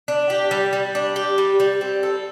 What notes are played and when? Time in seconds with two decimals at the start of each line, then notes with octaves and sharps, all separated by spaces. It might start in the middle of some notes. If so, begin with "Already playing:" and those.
0.08 D4
0.30 G4
0.51 G3
0.73 G3
0.95 D4
1.16 G4
1.38 G3
1.60 G3
1.81 C4
2.03 A4